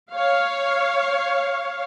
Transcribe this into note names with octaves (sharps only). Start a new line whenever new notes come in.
C#5 F5